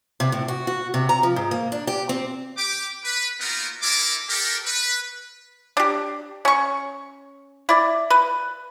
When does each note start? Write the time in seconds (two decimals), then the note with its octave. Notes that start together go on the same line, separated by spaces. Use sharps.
0.20 C3
0.32 A2
0.48 F#4
0.67 F#4
0.94 C3
1.09 A#5
1.23 F3
1.36 G#2
1.51 A#3
1.72 D4
1.87 G4
2.09 C4
2.58 G4 D6
3.05 B4
3.40 A#3 B3 D#4 F4 F#4 A#4
3.82 D4 E4 A4 A#4 D6
4.29 G4 A4 A#4
4.66 B4
5.77 D4 G4
6.45 C#4 C#6
7.69 E4 D5
8.10 B4